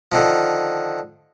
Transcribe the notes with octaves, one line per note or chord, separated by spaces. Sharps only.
D3 D#3 F3